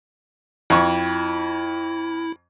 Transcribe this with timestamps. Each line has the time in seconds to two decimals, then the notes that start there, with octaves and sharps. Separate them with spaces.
0.70 F2 E4 C#6